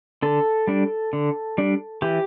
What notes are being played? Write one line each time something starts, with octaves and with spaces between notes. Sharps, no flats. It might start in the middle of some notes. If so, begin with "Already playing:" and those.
D3 A4
G3 D4
D3
G3 D4
E3 G4